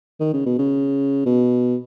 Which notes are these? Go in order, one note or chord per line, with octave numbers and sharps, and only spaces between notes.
D#3
C#3
B2
C#3
B2